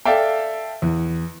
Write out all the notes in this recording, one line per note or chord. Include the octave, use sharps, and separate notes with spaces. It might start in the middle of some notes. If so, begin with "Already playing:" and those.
A4 D5 E5 F5 G5
E2